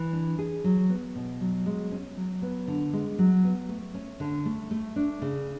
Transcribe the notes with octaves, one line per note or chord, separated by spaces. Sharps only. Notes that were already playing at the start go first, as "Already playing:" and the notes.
Already playing: E3
D4
G#4
F#3
B3
B2
F#3
G#3
C#4
F#3
B3
D3
G#3
F#3
B3
A3
C#4
D3
A3
A3
D4
C#3